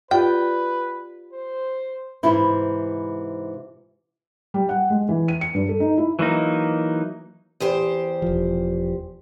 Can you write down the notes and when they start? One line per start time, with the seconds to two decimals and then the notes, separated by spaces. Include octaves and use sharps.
0.11 F4 G4 B4 D5 G5
1.33 C5
2.23 G#2 C3 E3 E4 C5
4.54 G3
4.69 F#5
4.90 G#3
5.09 E3
5.28 D#7
5.41 C#7
5.54 G2
5.69 A4
5.80 D#4
5.98 E4
6.19 E3 F#3 A#3 D#4
7.60 E2 G4 C5
8.22 E1 F3